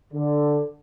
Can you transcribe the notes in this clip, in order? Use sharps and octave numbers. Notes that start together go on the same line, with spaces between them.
D3